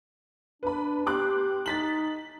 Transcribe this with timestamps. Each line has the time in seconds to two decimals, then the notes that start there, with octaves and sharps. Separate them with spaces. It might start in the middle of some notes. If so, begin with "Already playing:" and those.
0.63 D4 B4 B5
1.06 G4 C6 D6 F#6
1.66 D#4 A6 B6 F#7